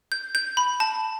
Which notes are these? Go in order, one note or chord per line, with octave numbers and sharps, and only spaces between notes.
G6
G6
B5
A5